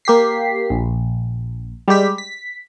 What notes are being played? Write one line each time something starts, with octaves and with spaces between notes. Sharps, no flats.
A#3 G4 B6 C7
A#1
G3 G#3 G4 B6
B6